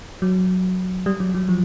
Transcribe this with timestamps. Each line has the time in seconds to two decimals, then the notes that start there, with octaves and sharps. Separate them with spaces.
0.22 F#3
1.06 G3
1.20 F#3
1.34 F#3
1.49 F3